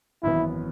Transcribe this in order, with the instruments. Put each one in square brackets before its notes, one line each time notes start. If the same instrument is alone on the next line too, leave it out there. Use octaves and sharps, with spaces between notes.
[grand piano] G#1 F#2 E3 B3 [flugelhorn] E4